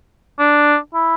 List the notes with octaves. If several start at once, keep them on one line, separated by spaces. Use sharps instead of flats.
D4
E4